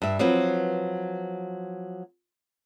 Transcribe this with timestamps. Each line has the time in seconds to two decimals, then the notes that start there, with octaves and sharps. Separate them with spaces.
0.02 G2 E5
0.19 F3 F#3 C4 B4